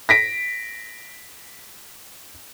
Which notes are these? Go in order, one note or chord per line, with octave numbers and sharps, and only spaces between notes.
A#6 B6 D7